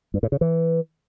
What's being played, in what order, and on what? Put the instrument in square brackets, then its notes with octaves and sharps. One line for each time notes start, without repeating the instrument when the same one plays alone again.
[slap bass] G2
A2
C#3
E3